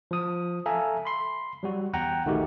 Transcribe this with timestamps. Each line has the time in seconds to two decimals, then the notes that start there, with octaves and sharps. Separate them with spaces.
0.11 F3 D#6
0.66 A4 E5 F5 G#5 A#5
1.05 B5 C6 C7
1.63 F#3 G3 F#4
1.93 E2 F#5 G5 A#5
2.25 A#1 D#3 A3 D#4 F#4 G4